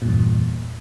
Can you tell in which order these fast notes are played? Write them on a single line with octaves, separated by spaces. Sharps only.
A#2 G2 E2